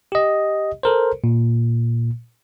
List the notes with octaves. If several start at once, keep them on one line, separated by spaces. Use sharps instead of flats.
G4 D#5
A4 A#4 C5
A#2